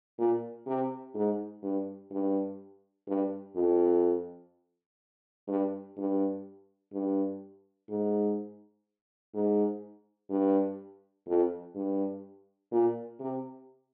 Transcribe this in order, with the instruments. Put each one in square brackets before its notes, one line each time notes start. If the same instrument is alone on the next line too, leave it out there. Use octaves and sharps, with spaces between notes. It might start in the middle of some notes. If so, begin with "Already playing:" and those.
[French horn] A#2
C3
G#2
G2
G2
G2
F2
G2
G2
G2
G#2
G#2
G2
F2
G2
A#2
C3